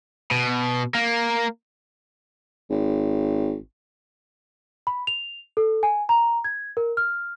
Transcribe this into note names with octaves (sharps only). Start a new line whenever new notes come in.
B2
A#3
G#1
B5
F7
A4
G#5
A#5
G#6
A#4
F6